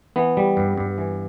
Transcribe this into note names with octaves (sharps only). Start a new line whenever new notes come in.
E3 B3
G3
G2
G2
E3